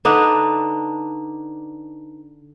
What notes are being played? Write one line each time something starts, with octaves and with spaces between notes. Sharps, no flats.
D3 D4 D#4 B4